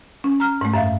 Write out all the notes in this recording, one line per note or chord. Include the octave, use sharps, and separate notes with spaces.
C#4
A#5 F6
G#2 A3
F#2 E5 F5